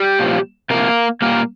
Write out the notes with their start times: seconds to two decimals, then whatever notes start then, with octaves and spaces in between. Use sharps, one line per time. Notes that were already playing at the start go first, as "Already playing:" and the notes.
Already playing: G3 G4
0.19 A#2 F3
0.70 C3 F3 A#3 A#4
1.22 A#2 G3 A#3 A#4